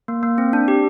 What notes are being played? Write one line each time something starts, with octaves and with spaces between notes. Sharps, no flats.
A#3
A#3
C4
D4
G4